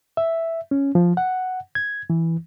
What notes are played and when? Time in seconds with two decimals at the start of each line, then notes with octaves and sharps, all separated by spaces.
0.17 E5
0.71 C#4
0.95 F3
1.17 F#5
1.75 G#6
2.10 E3